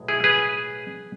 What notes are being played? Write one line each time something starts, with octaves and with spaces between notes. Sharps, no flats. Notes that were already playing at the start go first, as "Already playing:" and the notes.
Already playing: B1 A2 G#3
E4 G#4
G#4 B4